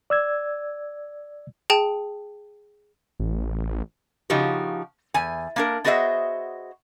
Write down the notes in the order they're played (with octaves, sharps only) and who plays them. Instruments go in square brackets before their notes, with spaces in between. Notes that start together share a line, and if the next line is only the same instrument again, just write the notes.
[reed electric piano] D5 E6 G#6
[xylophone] G#4 G5 A5
[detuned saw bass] A1
[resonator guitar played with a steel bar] C#3 F3 D#4 F#4 G4
E2 G#5
A#3 D4 A#4
B3 F#4 G#4 C5 D#5 E5